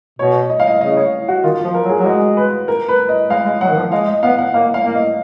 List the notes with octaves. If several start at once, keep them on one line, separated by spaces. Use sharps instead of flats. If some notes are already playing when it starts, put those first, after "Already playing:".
B2 C#5
D#5
F5
D#5
C#3 D#5
C#5
F#4
D#3 F4
F4
F3
A#4
F#3
G#4
F#3
G#3 F#4
B4
A#4
B4
D#5
G#3 F5
G#3
F#3 F#5
D#3
F3
G#3 F5
D#5
B3 F5
F#5
A#3 F5
F5
A#3
D#5